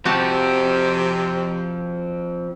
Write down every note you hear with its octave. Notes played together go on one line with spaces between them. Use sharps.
C3 F3 C4 F#4 G4 A5